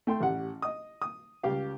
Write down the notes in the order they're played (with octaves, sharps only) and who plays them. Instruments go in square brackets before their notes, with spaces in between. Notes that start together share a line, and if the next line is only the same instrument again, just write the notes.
[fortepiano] A3 G5 C6
A1 G4 F#5
D#5 D#6
D#6
C#2 G3 G4 F5